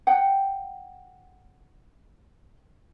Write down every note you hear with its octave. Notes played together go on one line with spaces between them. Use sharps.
F#5 G5